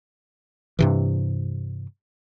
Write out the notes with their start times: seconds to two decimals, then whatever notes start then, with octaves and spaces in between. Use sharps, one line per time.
0.79 G2 C3 E3